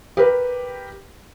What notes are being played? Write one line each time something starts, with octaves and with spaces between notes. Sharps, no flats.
G4 A#4 B4